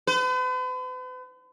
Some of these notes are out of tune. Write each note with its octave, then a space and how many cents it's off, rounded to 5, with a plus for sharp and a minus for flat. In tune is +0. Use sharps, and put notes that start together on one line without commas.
B4 +45